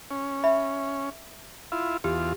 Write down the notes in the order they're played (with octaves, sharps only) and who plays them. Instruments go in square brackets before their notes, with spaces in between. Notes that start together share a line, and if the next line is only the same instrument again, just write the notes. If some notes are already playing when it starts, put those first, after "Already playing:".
[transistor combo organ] C#4
[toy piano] E5 B5
[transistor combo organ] E4 F4
[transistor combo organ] E2 F4 [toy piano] G4